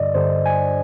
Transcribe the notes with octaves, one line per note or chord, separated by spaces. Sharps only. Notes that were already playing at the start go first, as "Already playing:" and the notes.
Already playing: G2 D3 D5 D#5
G2 D3 C5
G#5